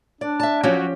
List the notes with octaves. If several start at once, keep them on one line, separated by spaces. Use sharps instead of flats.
D4 D5
E5 A5
F3 F#3 C#4 G4